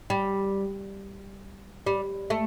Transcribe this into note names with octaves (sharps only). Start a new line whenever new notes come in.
G3
G3
A3